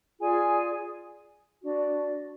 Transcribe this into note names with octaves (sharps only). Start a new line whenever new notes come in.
F4 G#4 D5 G#5
D4 F#4 D5